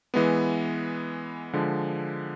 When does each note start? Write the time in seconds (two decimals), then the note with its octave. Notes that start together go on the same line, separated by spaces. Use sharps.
0.14 E3 G#3 B3
1.53 D3 F3 G#3